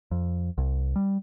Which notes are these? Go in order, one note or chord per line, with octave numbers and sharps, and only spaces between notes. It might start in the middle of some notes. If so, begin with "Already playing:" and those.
F2
C2
G3